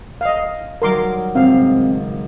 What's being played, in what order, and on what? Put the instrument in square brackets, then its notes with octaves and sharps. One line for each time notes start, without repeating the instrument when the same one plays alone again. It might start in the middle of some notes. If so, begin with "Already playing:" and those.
[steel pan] D#5 F5
[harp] F#3 G3 D#4 [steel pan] A#4 C6 D6
[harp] G#1 C#2 A2 [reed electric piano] C4 [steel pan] F5